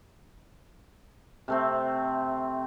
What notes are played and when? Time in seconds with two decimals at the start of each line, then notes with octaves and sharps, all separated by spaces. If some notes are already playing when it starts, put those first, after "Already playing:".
1.48 C3 A3 C4